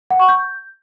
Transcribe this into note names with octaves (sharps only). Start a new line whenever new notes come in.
F#5
C#6
G6